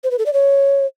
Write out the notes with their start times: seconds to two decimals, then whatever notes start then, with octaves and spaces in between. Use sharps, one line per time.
0.04 C5
0.11 B4
0.18 A4
0.26 D5
0.33 C#5